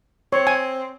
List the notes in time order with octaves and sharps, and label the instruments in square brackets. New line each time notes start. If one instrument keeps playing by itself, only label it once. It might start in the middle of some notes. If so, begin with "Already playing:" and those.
[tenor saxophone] C4 [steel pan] C#5
[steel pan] G#5